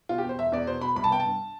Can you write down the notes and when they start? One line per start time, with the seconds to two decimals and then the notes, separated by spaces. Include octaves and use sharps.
0.09 B2 F4
0.18 G4
0.24 E2 C5
0.38 E1 E5
0.52 E2 D5
0.67 B2 C5
0.81 B2 B5
0.96 C2 B5
1.04 A5
1.10 B3 G5
1.20 A5
1.25 G2